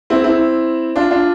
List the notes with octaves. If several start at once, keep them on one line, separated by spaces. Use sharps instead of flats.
C4 E4
C4 E4
D4 F4
D4 F4